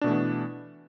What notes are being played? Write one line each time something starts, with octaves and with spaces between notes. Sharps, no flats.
B2 E3 A3 B3 D4